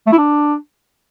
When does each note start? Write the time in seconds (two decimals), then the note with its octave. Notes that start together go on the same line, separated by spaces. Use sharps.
0.06 A3
0.12 E4
0.18 D4